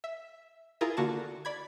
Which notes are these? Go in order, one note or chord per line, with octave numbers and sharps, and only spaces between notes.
E5
E4 F4 G#4 A#4
D3 A#3 F#4 F#5 A5 E7
D5 B5 G#6